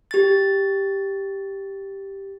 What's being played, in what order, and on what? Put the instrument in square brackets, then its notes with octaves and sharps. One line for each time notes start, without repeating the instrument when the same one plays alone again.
[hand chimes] G4 A6